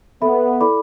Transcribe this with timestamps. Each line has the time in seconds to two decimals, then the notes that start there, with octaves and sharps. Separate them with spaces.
0.22 B3 A4 E5 B5
0.61 E4 A4 D5 B5 D6